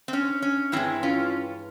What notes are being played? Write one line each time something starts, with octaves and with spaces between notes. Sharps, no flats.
C4
C#4
C#4
G2 E3 G#3 C4 E4
C#4 F4